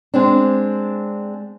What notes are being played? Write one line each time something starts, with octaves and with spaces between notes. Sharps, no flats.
G#3 C4 D4